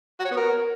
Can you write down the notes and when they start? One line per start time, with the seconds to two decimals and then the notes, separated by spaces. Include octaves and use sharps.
0.19 F#4
0.25 C#5
0.31 B3
0.37 A#4